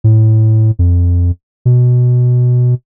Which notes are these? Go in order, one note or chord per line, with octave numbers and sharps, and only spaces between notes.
A2
F2
B2